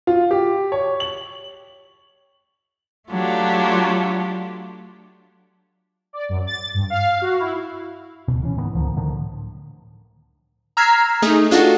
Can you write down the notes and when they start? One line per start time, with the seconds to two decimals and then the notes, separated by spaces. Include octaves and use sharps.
0.07 F4
0.31 G4
0.72 C#5
1.00 F#7
3.10 F#3 A3 D4 F4 G4
6.13 D5
6.29 F#2
6.47 A6
6.74 G2
6.90 F5
7.22 F#4
7.40 E4
8.28 D1 B2
8.43 E3 C#4
8.57 G#2 D#3 E3 B3
8.75 C#2 D3 D#3 F3
8.96 A2 D3 D#3 F3
10.77 A#5 E6 F6 G#6 B6 C7
11.22 A3 D#4 G#4
11.51 D4 F4 F#4 A4